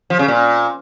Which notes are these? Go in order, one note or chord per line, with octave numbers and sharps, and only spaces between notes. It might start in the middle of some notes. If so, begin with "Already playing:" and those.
F3
C#3
A#2